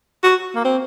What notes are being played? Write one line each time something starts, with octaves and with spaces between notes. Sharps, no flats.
F#4
A#3
C4